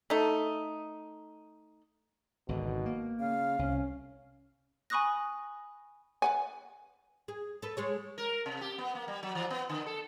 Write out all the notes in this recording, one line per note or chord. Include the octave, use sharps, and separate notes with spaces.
A3 D#4
G#1 G#2 B2 D3
A#3
C#3 F5
C2 C#4
G#5 B5 C#6 D#6 F#6 A#6
B4 F#5 G#5
G#4
A4 B4
G#3 G#4 C#5
A#4
C3
G4
B3
A#3
G3
F#3
E3
B3
D3
A4